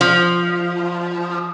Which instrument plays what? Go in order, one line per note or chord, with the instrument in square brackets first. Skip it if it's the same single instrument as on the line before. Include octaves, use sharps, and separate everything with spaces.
[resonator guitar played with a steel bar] F3